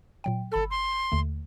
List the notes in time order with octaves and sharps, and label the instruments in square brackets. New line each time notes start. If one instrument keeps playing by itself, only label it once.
[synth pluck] A#2 F#3 G5
[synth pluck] G1 B5 E6 [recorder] A4
[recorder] C6
[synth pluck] D#2 D3 A3